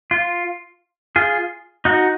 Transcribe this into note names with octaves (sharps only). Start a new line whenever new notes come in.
F4
F4 G#4
D#4 F#4